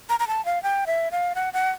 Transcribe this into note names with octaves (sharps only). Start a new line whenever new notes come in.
A#5
A#5
A5
F5
G5
E5
F5
F#5
F#5